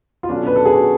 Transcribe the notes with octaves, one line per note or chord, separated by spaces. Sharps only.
F4
B2 F#3 A3 C#4 D4
B4
A4
G#4
F#4